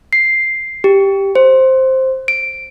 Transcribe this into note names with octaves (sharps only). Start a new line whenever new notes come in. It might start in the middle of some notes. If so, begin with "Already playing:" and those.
C7
G4
C5
D7